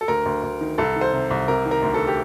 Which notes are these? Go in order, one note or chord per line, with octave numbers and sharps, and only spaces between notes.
A4
D2 A#4
D2
D2
D#3
C2 A4
D#3
C5
C3
C2
C3 A#4
D#3
A#4
D2
A4
G4